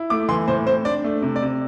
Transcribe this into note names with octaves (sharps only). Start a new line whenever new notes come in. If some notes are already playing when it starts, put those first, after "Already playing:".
Already playing: E4
A3 D6
E3 C6
A2 C5
C4 C5
D4 D5
A3
C3
D5
C3